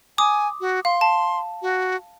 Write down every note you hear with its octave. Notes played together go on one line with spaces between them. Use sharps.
G#5 D6 D#6
F#4
F5 C6
A5
F#4